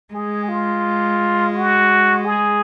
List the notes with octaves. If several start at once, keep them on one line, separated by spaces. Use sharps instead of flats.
G#3 G#4
F4
F#4
G#4